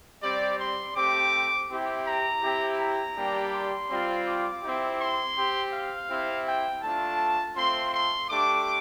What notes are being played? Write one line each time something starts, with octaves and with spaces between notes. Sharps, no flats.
G3 C4 G4 D5
C6
A3 C4 G4 D6
C4 E4 G4
A#5
C4 E4 G4
A#5
G3 A#3 D4 G4
C6
G3 C4 F4
D6
C4 E4 G4
C6
C4 G4
F5
C4 E4 G4
G5
A3 D4 F4 A5
A3 C4 F4 C6
C6
A3 D4 G4 D6